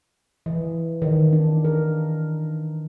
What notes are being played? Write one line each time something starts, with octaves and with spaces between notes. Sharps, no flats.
E3
D#3
D4
A#4